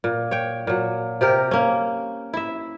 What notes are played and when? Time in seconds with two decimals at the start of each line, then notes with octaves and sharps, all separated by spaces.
0.04 A#2
0.31 C#5 G5
0.67 A#2 F#3
1.21 C3 G4 A#4
1.51 A#3 C#4
2.33 E4 E5